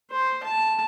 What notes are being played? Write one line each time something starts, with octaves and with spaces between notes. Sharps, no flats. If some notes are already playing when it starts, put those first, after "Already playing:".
C5
A5